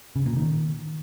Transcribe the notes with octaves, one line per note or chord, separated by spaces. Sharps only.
C#3
A#2
D#3